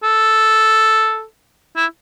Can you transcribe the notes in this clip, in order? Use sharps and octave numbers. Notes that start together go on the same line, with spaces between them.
A4
E4